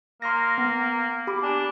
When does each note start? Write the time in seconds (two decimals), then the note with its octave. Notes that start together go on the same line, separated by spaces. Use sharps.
0.22 A#3 C6 F6 A#6
0.58 B3
1.27 G4 B5 D6
1.43 D4 G#5